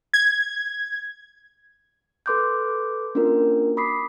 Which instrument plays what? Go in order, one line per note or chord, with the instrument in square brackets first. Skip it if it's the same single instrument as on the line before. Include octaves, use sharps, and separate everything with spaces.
[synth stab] G#6
[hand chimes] A4 B4 C6 D6 F#6 G6
A#3 C#4 D4 F4 F#4 A#4
B5 D6 D#6 B6 C7